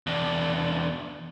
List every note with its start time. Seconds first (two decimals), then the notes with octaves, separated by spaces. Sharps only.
0.07 E2 D4